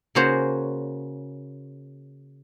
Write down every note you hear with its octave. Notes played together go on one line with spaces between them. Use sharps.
C#3 A#3 C#4 F#4 C5 C#5